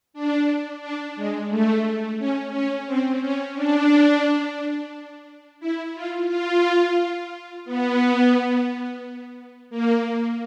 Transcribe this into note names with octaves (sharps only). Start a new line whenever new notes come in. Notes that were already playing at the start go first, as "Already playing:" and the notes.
D4
D4
G#3
A3
C#4
C#4
C4
C#4
D4
E4
F4
F4
B3
A#3